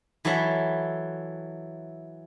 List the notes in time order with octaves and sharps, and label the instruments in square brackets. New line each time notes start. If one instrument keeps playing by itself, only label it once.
[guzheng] E3 F#3 A4 E5 F#5